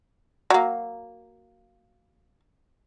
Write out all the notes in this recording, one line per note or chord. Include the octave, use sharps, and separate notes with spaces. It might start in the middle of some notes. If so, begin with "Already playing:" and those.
F#3 A#3